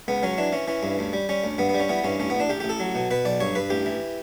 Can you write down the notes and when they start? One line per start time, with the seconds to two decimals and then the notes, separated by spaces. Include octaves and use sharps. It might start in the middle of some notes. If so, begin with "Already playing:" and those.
0.08 C#2 B3
0.23 F#3 C#4
0.38 E3 D4
0.52 E3 C#4
0.68 E3 C#4
0.83 G2
0.99 D2
1.13 G3
1.29 G3 C#4
1.44 D2
1.58 G2 B3
1.69 B3
1.74 G3
1.80 C#4
1.89 E3 B3
2.04 G2 C#4
2.20 A1 C#4
2.30 B3
2.35 A1
2.40 D4
2.49 A1 G4
2.60 A1 G4
2.69 A4
2.80 F#3
2.95 B2
3.11 B2 B4
3.25 B1 D5
3.40 G2 C#5
3.55 G2 B4
3.70 A1 G4
3.86 E3